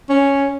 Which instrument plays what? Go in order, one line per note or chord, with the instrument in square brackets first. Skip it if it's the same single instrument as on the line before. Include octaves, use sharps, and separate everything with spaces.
[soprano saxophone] C#4